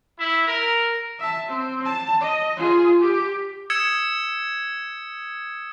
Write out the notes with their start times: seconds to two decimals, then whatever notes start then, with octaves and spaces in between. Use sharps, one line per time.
0.18 E4
0.48 A#4
1.19 E5 A5
1.49 C4
1.86 A5
2.22 D#5
2.57 F4 G#4
3.00 G4
3.70 D#6 E6 G#6 C#7 E7